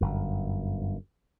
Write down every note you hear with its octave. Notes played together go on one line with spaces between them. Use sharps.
G1 F#2